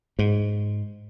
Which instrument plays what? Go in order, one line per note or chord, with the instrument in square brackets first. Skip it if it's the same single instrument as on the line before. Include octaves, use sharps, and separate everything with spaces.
[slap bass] G#2